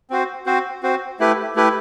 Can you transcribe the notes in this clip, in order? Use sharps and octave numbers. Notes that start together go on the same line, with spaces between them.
C4 F#4 C5
C4 F#4 C5
C4 F#4 C5
A3 E4 G4 B4
A3 E4 G4 B4